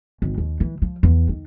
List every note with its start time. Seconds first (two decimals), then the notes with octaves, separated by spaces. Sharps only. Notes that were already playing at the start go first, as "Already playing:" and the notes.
0.22 G#1
0.38 D#2
0.60 E3
0.82 F3
1.03 E2
1.29 D#3